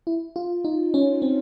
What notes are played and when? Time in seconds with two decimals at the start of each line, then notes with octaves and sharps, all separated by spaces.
0.07 E4
0.36 F4
0.65 D#4
0.94 C#4
1.22 C4